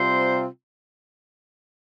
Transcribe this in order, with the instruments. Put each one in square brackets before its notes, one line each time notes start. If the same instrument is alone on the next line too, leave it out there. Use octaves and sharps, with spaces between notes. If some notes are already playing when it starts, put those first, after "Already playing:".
Already playing: [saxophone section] C3 G3 C4 F4 [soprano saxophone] C5